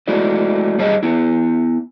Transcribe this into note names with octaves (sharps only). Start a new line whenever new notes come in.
G#3 A3 E4 F#4 D5
G2 G3 G#4 C#5 D#5 A5
B3 E4